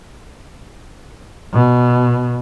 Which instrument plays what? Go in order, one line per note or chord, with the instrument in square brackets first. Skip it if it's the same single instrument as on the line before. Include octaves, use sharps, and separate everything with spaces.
[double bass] B2